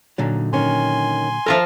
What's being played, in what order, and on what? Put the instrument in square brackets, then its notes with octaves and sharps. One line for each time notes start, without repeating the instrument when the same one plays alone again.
[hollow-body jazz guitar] A#2 D3 F#3 [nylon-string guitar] D#4
[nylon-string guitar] D#3 C#4 [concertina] G#5 C6
[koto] F3 F4 A#4 [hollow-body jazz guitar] A4 E5